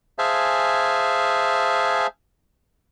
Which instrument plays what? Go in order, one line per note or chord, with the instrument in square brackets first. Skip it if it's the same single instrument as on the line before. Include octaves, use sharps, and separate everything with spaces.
[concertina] G#4 C5 E5 F5 G#5 A5